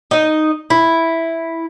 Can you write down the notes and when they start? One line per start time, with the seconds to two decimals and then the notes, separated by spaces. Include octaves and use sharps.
0.11 D#4 D#5
0.70 E4